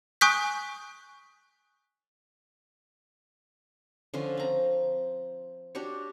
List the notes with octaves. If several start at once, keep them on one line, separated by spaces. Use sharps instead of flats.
G#5 C#6 D#6 F#6 G6 B6
D3 F3 C#4 F4
C4 A#5
D4 F#4 G4 C#5